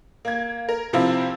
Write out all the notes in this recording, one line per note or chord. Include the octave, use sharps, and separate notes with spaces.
A#3 G#6
A#4
C3 F3 C4 E4 F4